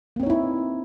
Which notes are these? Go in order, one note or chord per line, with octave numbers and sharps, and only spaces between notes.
A#3 C4 D#4 E4 C#5